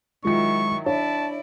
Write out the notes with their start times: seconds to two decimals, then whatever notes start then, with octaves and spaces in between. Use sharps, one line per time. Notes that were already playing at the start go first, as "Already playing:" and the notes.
0.25 D#3 F#3 G#3 E4 F4 C#6 C#7
0.86 D4 E4 C#5 D5 A5